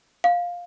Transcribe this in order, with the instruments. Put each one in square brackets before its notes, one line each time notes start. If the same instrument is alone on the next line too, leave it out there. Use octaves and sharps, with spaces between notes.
[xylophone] F5